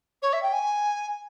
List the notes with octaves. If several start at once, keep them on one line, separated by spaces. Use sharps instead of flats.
C#5
E5
G5
G#5